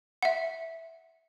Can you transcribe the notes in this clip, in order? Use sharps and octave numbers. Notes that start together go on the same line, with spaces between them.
E5 F#5